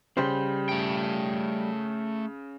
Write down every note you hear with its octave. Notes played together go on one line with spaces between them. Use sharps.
C#3 G3 C5
A3 G5